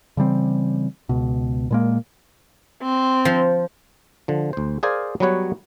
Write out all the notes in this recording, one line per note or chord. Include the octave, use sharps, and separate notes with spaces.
C#3 E3 G3 C4
C#2 B2
A#2 G#3 A#3
C4
F3
D3 F3
D2 C5
G#4 A#4 C5 D5 F5 G#5
F#3 G3 B3 B4 C#5 F#5